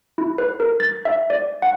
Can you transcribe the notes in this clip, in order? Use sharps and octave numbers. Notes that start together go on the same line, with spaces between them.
E4
B4
A#4
A6
E5
D5
F#5